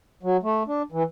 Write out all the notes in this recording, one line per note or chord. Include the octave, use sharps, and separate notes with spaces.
F#3
A3
D4
E3